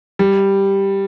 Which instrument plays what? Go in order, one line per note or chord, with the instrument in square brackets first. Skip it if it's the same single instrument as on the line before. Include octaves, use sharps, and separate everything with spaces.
[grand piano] G3